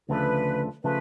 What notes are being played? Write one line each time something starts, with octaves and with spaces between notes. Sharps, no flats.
D2 C#3 F3 A3 D4 B4
C#3 F3 A3 B4